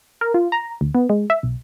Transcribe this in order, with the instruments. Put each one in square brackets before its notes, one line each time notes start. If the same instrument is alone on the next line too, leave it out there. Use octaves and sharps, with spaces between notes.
[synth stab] A#4
F4
A#5
D2
B3
G#3
E5
B1